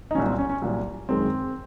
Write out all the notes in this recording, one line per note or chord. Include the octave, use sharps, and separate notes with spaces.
D#4
C2 A#2 F#3 C#4
C4
C#4
C#4
C2 A#2 F#3
F#2 D#3 G#3 C4